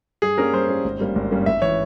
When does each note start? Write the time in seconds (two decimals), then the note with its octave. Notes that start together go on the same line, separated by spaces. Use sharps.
0.22 G2 G#4
0.37 G3 A#3 C#4 A#4
0.53 G2 C5
0.69 G3 A#3 C#4
0.84 G#1
0.99 G2 G3 A#3 C#4
1.16 G#1
1.31 G2 G3 A#3 C#4
1.46 G#1 E5
1.62 E3 C#5